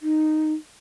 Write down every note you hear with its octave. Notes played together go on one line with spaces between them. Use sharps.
D#4